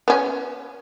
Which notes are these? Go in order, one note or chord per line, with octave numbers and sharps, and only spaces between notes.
B3 C#4